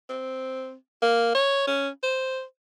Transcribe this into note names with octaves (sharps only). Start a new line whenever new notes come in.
C4
A#3
C#5
C#4
C5